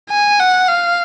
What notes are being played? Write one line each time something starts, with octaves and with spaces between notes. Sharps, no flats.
G#5
F#5
F5